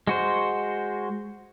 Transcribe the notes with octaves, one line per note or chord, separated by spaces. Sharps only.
G#3 F#4 C5